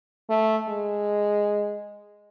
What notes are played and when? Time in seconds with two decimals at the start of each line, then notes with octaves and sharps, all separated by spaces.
0.30 A3
0.68 G#3